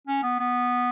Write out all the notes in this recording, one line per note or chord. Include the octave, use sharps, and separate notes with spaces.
C#4
B3
B3